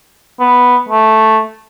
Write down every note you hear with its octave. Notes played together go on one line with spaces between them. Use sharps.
B3
A3